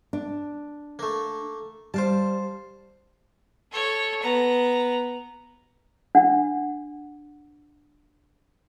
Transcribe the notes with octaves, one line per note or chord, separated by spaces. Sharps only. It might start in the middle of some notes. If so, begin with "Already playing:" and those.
D4
A3 A#3
G3 C5 F5 A5
A4 C#5
B3 A#5
D4 F#5